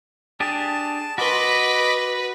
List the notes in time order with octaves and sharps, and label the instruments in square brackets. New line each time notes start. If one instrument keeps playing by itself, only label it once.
[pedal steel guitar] D4 G4 G#4 [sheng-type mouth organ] A5
[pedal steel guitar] F#4 C6 [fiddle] B4 [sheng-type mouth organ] D#5 B5 D6